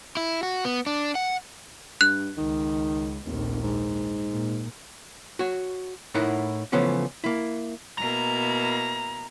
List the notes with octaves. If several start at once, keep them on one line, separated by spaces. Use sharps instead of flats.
E4
F#4
B3
D4
F#5
G2 F#6
C#2 D#3
F1 A#1 D#2
G#2
A#2
F#4 C#5
A2 D#4 E4 A#4 D#5 F#5
C#3 E3 F3 A3 B3 C#4
A#3 E4
B2 A#3 E4 A#5